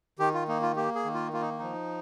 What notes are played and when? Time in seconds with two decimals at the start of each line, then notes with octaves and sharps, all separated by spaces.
0.19 D#3 G4
0.34 F4
0.48 A#3 D#4
0.62 F4
0.76 A#3 G4
0.95 G#4
1.05 D#3
1.14 F4
1.33 A#3 F4
1.41 D#4
1.59 F3 D#4